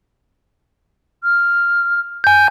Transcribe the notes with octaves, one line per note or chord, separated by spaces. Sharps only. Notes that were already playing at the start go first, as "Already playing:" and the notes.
F6
G#5 G6